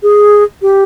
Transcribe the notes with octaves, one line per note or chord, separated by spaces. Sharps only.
G#4
G4